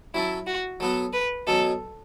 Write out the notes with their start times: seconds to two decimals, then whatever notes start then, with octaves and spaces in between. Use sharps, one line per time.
0.14 F#3 C#4 E4 A4
0.47 F#4
0.80 F#3 B3 F#4 A4
1.13 B4
1.47 B2 F#3 C#4 A4